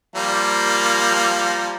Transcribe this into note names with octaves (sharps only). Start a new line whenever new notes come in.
F3 G3 A#3